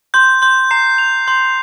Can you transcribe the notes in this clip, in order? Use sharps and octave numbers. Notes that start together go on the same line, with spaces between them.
C6 G6
C6 G6
A#5 C7
F7
C6 G6